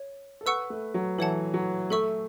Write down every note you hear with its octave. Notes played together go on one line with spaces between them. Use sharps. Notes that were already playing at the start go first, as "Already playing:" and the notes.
Already playing: C#5
A4
B4 F#5 C#6 E6
A3
F#3
E3 A4 C#5 F#5 A5
F#3
A3 A4 E5 C#6 E6